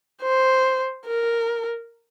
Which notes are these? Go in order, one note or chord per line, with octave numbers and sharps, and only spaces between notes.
C5
A#4